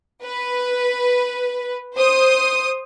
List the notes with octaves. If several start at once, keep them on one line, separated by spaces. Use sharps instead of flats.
B4
C5 D#6